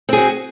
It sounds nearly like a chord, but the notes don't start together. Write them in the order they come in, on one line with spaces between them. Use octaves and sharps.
C4 G#4 F#4